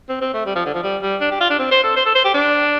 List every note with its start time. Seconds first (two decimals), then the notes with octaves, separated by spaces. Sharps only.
0.09 C4
0.21 C4
0.34 A3
0.46 G3
0.55 F3
0.65 D3
0.74 F3
0.83 G3
1.02 G3
1.21 D4
1.31 G4
1.40 F4
1.50 D4
1.59 C4
1.71 C5
1.84 A4
1.96 C5
2.06 A4
2.15 C5
2.25 G4
2.34 D4